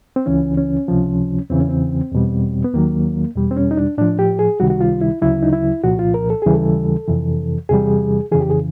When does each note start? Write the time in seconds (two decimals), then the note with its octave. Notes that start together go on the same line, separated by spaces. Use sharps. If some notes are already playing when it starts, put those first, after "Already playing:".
0.16 C4
0.26 C#2 C#3 E3 C#4
0.57 C#4
0.88 C#2 C3 F3
1.50 E2 C#3 E3 C4
1.60 C#4
1.69 C4
2.12 E2 B2 G3
2.64 B3
2.73 D#2 D#3 F#3 A#3
3.36 E2 B2 G3
3.51 C4
3.57 C#4
3.71 D#4
3.77 D4
3.98 A2 F3 D4
4.19 G4
4.39 G#4
4.59 C#2 C3 D#3 G3 F#4
4.70 F#4
4.81 F4
5.01 E4
5.21 D2 C#3 F#3 E4
5.43 D#4
5.53 E4
5.83 C2 A#2 F3 F#4
5.99 F4
6.14 A#4
6.30 A4
6.42 D#2 C#3 E3 G3 G#4
6.54 A4
7.08 F2 C3 E3
7.69 E2 C3 E3 G3 G#4
8.32 F2 C#3 E3 G#4
8.41 G4
8.50 G#4